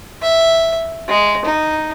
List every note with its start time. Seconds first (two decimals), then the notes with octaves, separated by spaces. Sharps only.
0.22 E5
1.08 G#3
1.45 D#4